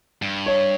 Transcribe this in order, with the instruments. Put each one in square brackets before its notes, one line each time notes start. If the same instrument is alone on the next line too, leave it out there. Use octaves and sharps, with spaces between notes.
[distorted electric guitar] G2
[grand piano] C#5